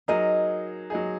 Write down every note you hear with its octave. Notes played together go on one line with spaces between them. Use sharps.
F#3 D#4 G#4 A#4 D#5
F#3 D#4 G#4